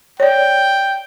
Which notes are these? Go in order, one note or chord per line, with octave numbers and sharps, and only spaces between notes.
C#5 D5 G5